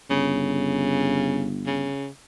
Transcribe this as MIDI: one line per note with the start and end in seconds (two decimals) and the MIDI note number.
0.10 1.91 31
0.10 1.50 49
1.66 2.08 49